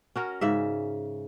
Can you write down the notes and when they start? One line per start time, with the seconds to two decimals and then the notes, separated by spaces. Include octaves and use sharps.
0.16 C#4 F#4 A#4
0.41 G#2 C#3 E5